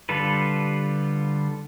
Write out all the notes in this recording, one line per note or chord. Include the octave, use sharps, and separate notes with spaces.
D3 G3 F4 A4 B4